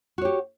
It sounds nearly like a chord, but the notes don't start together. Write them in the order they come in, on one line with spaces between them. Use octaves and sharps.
F#4 C#5 G4